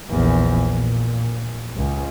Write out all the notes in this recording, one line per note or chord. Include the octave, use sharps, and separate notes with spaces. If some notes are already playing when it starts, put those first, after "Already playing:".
A#1 E2
A#2
C#2